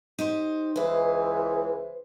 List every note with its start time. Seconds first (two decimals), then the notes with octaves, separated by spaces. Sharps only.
0.19 D#4 G4 C5
0.76 C#2 E3 B4 C5